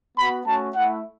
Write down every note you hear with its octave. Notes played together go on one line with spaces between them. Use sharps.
B3 F#4 B5
A3 C#4 F#4 A5
A3 E4 F#5